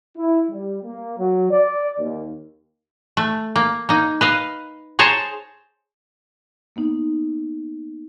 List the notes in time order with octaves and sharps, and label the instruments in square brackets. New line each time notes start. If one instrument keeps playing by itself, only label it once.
[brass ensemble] E4
G3
A#3
F#3
D5
D#2
[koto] A3
A#3
A#3 D#4
B4 D#5 F5
G#4 C5 C#5 A5 A#5
[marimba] A#3 B3 D#4